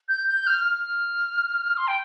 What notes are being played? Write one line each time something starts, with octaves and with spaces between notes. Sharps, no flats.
G6
G6
F6
F6
C6
G5